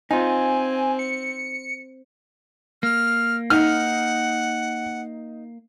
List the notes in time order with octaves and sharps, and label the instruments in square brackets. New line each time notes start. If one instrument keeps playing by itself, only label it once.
[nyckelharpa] C4 [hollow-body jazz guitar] D#4 F4 [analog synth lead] G#5
[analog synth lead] C#7
[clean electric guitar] A#3 [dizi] F6
[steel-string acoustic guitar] D#4 [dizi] F#5 [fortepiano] F6